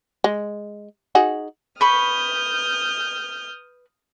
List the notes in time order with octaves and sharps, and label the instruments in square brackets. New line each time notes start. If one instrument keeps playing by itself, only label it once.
[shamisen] G#3
D#4 F#4 G#4
[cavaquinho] B4 B5 C#6 [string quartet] D#6 F6 G6